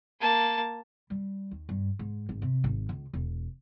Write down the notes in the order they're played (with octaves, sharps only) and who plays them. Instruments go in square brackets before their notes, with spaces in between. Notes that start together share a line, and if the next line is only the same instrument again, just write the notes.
[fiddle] A#3 A5
[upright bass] G3
D#2
G2
G#2
G#1
C3
G#1
C#2
E1